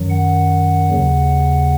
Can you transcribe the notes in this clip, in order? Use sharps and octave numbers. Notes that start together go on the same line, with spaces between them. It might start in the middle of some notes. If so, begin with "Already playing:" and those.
Already playing: F#2 D#3 F#3
F#5
D#2 C#3 F#3